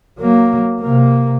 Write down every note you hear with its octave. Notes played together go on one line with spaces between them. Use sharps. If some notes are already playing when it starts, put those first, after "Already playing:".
F#3 A#3
C3 A#3